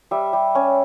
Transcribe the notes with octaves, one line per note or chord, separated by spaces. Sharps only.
G3 E5
G3
C#4